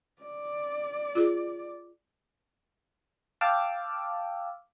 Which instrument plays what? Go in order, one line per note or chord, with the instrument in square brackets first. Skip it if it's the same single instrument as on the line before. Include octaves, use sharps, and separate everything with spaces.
[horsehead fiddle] D5
[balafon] F4 G#4
[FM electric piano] F5 G5 A5 D6 E6 F6